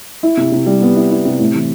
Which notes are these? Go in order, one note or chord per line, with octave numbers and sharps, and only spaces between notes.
E4
C3
C3
G3
B3
E4
E4
C3
A2
E3